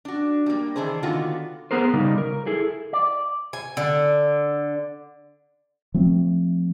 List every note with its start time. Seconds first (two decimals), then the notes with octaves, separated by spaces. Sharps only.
0.05 D4 F#4
0.46 G3 A#3
0.76 D#3 E3 D4 G#4 C5
1.03 D3 D#3 A#3 B3 F4 F#4
1.71 B3 G#4 A#4 C5
1.93 C#3 G3 D#4
2.18 A#4
2.46 E4 G#4 A4
2.93 D5
3.53 G#5
3.77 D3
5.94 F3 A3 C4